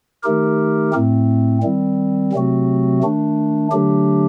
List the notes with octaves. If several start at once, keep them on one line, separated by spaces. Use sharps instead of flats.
D#3 A3 D#4 G4 A#4
A2 A3 C4
D#3 G3 C4
C3 F#3 A3 C4 F#4
D#3 A3 D4
D3 F#3 A3 D4 G4